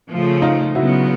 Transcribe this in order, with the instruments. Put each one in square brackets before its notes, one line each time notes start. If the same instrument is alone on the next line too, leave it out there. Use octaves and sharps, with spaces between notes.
[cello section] C#3 F3 A3
[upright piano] D#4 F4
[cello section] C#3 F#3 B3 [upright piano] E4 F#4